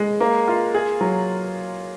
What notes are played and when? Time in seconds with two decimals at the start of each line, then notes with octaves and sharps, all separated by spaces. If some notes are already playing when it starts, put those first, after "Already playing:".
Already playing: G#3
0.20 A#3
0.48 F4
0.74 G#4
1.01 F#3